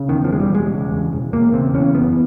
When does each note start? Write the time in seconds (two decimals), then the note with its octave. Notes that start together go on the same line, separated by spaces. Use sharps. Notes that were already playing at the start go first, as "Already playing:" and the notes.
Already playing: C#3
0.08 E2 D#3
0.24 F3
0.30 E1 G#3
0.40 G3
0.50 E1 G#3
0.71 C#3
0.92 E2
1.13 E1
1.33 E1 A#3
1.53 C#3 C4
1.74 E2 C#4
1.95 F#1 B3